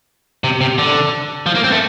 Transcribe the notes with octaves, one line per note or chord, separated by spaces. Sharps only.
C3
C3
D3
F3
A#3
C4
A3